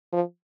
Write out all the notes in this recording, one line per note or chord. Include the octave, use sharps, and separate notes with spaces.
F3